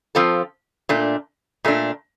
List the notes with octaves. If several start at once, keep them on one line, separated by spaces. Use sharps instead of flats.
F3 C4 F4 A4
A#2 A3 D4
A#2 A3 D4